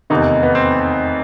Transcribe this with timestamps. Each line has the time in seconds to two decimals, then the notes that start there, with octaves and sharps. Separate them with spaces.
0.10 F1 E2 C3 D#3 D#4
0.43 B3
0.55 C4